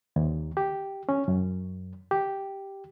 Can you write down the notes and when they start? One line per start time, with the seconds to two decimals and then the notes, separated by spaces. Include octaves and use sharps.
0.16 D#2
0.57 G4
1.09 C#4
1.28 F#2
2.11 G4